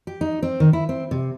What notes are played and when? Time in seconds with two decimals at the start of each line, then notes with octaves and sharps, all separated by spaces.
0.07 G4
0.21 D#4
0.42 C4
0.60 D#3
0.73 E4
0.89 C4
1.11 C3